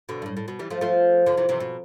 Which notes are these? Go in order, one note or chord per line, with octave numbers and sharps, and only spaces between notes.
B2 D3
G2
A2
A2
B2
E3 G3
F3 A3
F3 A3
D3 F3
C3 E3
C3 E3
B2